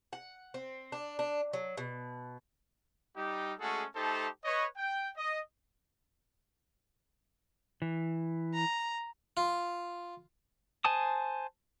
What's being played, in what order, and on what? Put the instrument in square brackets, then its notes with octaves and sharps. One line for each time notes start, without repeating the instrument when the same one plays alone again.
[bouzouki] F#5
C4
D4
D4
F#3
B2
[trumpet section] G3 D#4 G4
G#3 A3 C#4 F#4 G#4 A4
A3 D#4 G4 A4 C5 A5
B4 C#5 D#5
G5
D#5
[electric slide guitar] E3
[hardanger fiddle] A#5
[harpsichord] F4
[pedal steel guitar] C5 G#5 A5 D#6